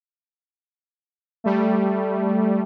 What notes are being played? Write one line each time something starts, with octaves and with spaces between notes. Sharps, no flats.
G3 A3